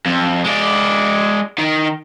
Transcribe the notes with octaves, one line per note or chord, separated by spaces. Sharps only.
F2
G#3 D5
D#3